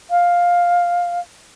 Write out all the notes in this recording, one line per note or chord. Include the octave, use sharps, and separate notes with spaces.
F5